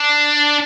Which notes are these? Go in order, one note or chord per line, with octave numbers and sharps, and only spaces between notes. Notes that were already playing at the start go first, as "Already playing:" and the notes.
Already playing: D4